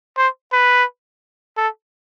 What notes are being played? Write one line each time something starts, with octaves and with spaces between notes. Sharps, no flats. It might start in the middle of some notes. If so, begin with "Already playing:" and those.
C5
B4
A4